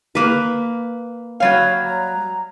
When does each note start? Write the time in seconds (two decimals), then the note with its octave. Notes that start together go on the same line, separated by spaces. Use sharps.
0.15 A#3 B4
1.40 F#3 G3 C#5 F5
1.85 A#5